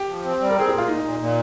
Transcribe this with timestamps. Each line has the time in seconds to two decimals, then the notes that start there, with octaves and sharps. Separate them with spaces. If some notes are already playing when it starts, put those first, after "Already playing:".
Already playing: G4
0.09 F3
0.24 C4
0.41 G3
0.49 A#4
0.56 C4 G#4
0.69 A#2 G4
0.78 F4
0.88 A#2 D#4
1.04 A#2
1.19 A#2